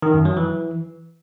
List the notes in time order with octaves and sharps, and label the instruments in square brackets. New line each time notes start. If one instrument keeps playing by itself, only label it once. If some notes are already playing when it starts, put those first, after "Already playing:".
[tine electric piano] D#3
F#2
F#3
E3